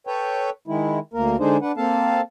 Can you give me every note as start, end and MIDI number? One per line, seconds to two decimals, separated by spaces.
0.07 0.50 69
0.07 0.50 71
0.07 0.50 73
0.07 0.50 79
0.68 0.99 51
0.68 0.99 56
0.68 0.99 64
1.14 1.36 38
1.14 1.36 58
1.14 1.36 70
1.40 1.57 50
1.40 1.57 56
1.40 1.57 62
1.40 1.57 63
1.40 1.57 68
1.40 1.57 72
1.62 1.72 62
1.62 1.72 71
1.62 1.72 78
1.77 2.21 58
1.77 2.21 60
1.77 2.21 69
1.77 2.21 77
1.77 2.21 81